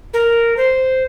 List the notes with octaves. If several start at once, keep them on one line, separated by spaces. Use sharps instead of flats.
A#4
C5